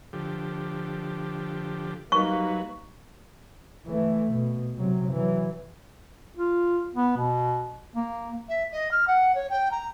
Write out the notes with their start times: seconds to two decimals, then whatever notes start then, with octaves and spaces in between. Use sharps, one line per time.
0.13 D3 F3 G4
2.12 F#3 G3 A#3 D#4 B4 C#6
3.87 E3 A3
4.32 B2
4.78 C3 F#3
5.13 E3 F#3
6.37 F4
6.95 B3
7.17 B2
7.96 A#3
8.48 E5
8.71 D#5
8.91 F6
9.07 F#5
9.34 C#5
9.49 G5
9.71 A#5